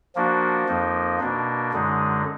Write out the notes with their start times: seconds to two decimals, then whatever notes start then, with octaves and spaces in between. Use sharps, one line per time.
0.15 F3 A#3 D4 F#4
0.68 F2 F3 A#3 D#4
1.20 B2 A#3 D4
1.72 F#2 D3 G#3 D#4